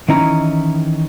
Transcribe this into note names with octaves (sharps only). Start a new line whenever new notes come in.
D#3 E3 C#4 D#4 E4 A#5